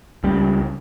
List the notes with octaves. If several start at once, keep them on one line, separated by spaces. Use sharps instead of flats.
C#2 G3